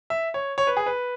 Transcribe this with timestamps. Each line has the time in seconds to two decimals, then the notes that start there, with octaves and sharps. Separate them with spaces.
0.10 E5
0.34 C#5
0.58 C#5
0.67 B4
0.77 G#4
0.86 B4